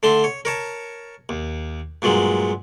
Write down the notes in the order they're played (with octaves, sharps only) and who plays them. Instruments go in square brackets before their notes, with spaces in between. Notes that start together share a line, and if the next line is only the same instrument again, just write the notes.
[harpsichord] D3 A3 A5 C6
C#5
A#4 C#5 A5
D#2
G2 A#2 F#3 G#3